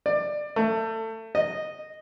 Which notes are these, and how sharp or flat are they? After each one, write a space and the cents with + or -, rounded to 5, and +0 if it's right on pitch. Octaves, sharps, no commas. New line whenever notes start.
D5 +20
A3 +25
D#5 -10